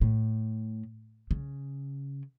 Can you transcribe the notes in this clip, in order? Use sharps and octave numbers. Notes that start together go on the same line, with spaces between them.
A2
C#3